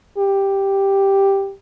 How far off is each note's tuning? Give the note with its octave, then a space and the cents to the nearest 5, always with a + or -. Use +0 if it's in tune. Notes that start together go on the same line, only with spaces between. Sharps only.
G4 +0